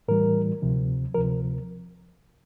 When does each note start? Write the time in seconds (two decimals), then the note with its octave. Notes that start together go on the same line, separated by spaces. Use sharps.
0.08 A2 E3 G3 A#4
0.62 D2 C3 F3
1.14 D2 C3 F3 A#4